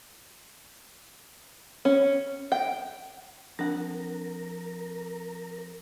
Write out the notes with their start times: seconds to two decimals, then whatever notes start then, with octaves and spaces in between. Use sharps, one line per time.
1.85 C#4
2.52 G5
3.59 F2 D4 A#4 F#5